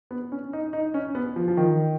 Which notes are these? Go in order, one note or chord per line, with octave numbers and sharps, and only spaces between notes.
B3
C#4
D#4
D#4
C#4
B3
F3
F3
D#3